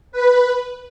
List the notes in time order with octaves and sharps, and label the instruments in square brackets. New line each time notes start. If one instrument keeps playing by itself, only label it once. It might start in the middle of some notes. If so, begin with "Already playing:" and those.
[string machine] B4